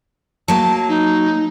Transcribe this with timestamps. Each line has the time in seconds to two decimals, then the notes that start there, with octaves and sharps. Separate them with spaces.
0.48 F#3 A#3 A5
0.89 D#4